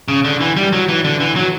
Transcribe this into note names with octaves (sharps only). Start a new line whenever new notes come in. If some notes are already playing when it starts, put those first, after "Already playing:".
C#3
D3
E3
G3
F#3
E3
D3
E3
F#3